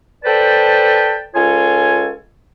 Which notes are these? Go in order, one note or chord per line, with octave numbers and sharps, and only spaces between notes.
A4 B4 C5 D5 G5 A5
C#2 F4 A4 C#5 G#5